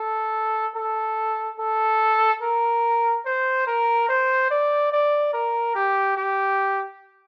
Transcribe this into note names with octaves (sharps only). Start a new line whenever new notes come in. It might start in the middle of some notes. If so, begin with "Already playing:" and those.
Already playing: A4
A4
A4
A#4
C5
A#4
C5
D5
D5
A#4
G4
G4